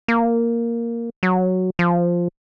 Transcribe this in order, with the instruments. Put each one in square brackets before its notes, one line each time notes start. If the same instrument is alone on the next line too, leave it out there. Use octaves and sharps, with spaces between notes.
[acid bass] A#3
F#3
F3